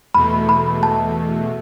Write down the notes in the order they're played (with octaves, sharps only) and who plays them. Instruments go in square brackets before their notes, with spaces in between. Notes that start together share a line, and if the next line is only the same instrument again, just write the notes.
[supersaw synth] E2 B2 A3 [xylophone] B5
[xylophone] B5
A5